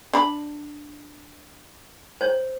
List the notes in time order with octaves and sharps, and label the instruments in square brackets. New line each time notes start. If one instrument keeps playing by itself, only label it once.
[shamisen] D4 B5
[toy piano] C5 C#5